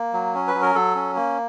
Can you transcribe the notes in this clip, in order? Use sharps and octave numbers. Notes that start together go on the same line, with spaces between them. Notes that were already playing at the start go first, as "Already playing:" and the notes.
Already playing: A#3
F#3
C#4
B4
F#3
A#4
F#3 A4
C#4
A#3